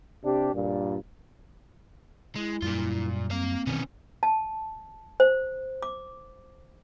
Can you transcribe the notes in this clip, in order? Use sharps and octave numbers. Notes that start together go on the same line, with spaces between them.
C3 D4 G4
G2 A#2
G#3 E4
F#2 A#2 G3 F4
A#3 C4 F5
B2 D#3 E3 B3 C#4
A5
C5
D6